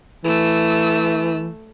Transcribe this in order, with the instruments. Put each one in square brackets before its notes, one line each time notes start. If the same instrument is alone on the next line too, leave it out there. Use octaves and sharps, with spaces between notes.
[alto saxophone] E3 [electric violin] A3 E6